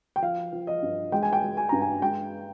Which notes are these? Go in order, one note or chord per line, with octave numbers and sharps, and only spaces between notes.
G5
F3 F5
F3
D#5
G2
G#3 G5
G#5
G5
G#3
G#5
G2 A#5
G#5
G#3 G5